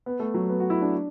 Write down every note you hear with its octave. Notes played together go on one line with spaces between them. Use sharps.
B3
A3
F#3
B3
F#4
E4
D4